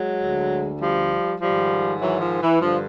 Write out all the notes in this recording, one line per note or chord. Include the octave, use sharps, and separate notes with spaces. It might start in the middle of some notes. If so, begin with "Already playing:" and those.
Already playing: F#3 G#3
D2 D3
F3 G3
G#2 D#3 F3 G3
E3 F#3
F3
E3
G2 D3 F3